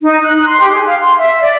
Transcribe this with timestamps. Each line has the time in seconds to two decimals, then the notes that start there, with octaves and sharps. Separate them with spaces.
0.01 D#4
0.23 F#6
0.47 C6
0.60 G4
0.73 G#4
0.86 F5
1.00 C6
1.18 E5
1.42 D5